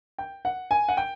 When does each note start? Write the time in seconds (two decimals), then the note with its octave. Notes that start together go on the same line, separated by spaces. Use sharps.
0.18 G5
0.45 F#5
0.71 G#5
0.89 F#5
0.97 G5